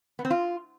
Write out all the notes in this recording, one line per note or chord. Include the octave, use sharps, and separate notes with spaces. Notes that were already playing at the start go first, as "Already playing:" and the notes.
B3
C4
F4